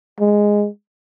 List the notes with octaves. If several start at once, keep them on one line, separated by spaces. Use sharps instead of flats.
G#3